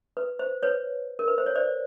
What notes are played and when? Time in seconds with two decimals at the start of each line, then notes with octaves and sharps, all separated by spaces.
0.17 B4
0.39 C5
0.63 B4 C#5
1.19 A#4
1.28 B4
1.38 C5
1.46 C#5
1.55 C5 D5